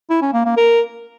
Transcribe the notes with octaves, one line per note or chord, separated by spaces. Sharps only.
E4
C#4
A#3
A#3
A#4